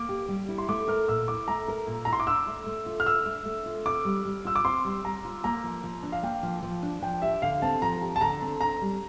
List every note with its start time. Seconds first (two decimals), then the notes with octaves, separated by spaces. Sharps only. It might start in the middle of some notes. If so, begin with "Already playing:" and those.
Already playing: A#3 D6
0.09 G4
0.28 G3
0.49 E4
0.58 C6
0.69 A3 D6
0.88 A#4 F6
1.08 A#2 E6
1.28 E4 D6
1.48 A3 A#5
1.68 A#4
1.87 A#2
2.05 E4 A#5
2.13 C6
2.20 D6
2.27 D4 E6
2.47 A3
2.66 A3
2.86 F4
3.00 F6
3.06 D4 E6
3.26 A3
3.45 A3
3.66 F4
3.86 C4 D6
4.05 G3
4.25 G3
4.45 F4 E6
4.56 D6
4.64 C4 C6
4.85 G3
5.04 G3 A#5
5.25 F4
5.44 A#3 A#5
5.64 F3
5.84 F3
6.03 D4
6.12 F5
6.23 A#3 G5
6.43 F3
6.63 F3
6.83 D4
7.02 F3 G5
7.22 G4 E5
7.42 D3 F5
7.62 C4 A5
7.82 F3 A#5
8.01 G4
8.16 A5
8.21 D3 A#5
8.42 C4
8.61 D4 A#5
8.81 G3